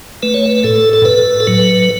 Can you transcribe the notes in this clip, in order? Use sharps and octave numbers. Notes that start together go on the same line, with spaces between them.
A3 B4
C#5
B4
A2 A4
A4
A2 B4
A4
F#3 B4